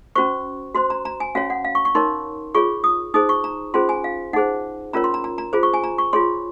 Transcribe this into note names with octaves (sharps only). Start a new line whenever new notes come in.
C#4 F#4 C5 C#6
F#4 C5 C6
A#5
A#5
G#5
C#4 F#4 C#5 F5
F#5
F5
C#6
C#6
D#4 A#4 C#5 C6
F4 G#4 C#5 C#6
D#6
D#4 G#4 C5 D#6
C#6
A#5
C#4 F4 G#4 C5 C6
G#5
F5
D#4 G#4 C5 F#5
C#4 F4 A#4 C#5 A#5
C6
A#5
A#5
A#5
F4 G#4 C5
C#6
G#5
A#5
C#6
F4 G#4 C#5 C6